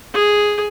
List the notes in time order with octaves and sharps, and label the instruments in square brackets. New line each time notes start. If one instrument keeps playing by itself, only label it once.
[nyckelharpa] G#4